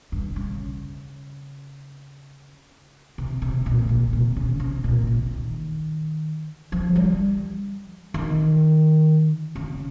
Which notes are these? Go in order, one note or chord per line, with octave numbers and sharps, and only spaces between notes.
G2
C#3
C3
C3
A#2
A#2
C3
C#3
C3
A#2
C3
D#3
F3
G3
D#3
C#3